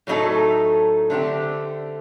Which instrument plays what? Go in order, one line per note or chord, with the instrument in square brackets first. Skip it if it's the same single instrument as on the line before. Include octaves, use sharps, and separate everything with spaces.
[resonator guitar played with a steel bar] A2 F#3 A3 D#4 A4
D3 A3 C4 G4